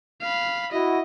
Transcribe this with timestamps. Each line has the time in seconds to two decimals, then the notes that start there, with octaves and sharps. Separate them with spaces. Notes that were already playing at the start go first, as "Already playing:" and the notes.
0.21 F5 B5
0.72 E4 F#4 D#5